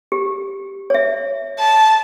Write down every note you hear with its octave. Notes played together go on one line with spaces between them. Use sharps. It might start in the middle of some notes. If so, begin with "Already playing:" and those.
G4
C#5 E5
A5